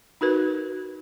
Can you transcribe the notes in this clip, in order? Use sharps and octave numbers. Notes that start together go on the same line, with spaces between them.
D#4 F#4 A#4 B4